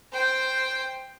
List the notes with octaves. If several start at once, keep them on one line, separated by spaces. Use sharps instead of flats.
C5 G5